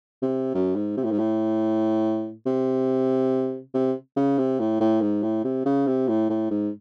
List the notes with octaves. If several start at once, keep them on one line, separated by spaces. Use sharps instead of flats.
C3
F#2
G#2
C3
A2
G#2
A2
C3
C3
C#3
C3
A2
A2
G#2
A2
C3
C#3
C3
A2
A2
G#2